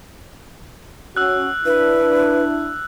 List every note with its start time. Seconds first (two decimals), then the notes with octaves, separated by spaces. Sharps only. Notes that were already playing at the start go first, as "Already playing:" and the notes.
1.17 C#4 F#4 E6 F#6
1.66 D4 E4 B4